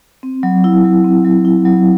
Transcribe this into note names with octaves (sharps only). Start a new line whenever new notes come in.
C4
F#3
E4
F#3
C4
F#3
E4
F#3